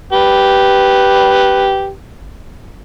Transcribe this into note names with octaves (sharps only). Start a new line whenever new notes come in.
G4 B4